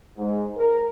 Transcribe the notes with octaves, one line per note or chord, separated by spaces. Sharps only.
G#2
A#4